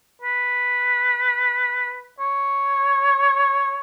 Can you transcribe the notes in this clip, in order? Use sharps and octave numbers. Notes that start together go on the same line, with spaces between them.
B4
C#5